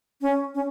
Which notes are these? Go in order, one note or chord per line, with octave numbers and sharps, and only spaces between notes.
C#4
C#4